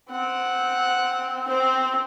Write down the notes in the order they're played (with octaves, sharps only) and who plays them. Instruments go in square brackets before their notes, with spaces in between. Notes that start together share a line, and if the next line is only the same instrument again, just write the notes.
[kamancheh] C4 [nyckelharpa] F#5
[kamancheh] C4 [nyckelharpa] C5